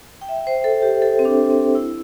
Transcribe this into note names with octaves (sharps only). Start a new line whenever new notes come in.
G5
E5
C5
A4
G4
A4
C4
D4
C4
E4